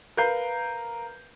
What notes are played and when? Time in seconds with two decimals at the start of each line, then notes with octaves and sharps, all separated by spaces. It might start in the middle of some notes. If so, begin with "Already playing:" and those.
0.17 A#4 B4 F5 G6 C7